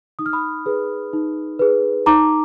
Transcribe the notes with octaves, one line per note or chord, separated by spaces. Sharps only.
D#4 D#6
F6
B5 D#6
G#4 B4
D#4
G#4 B4
D#4 A#5 D6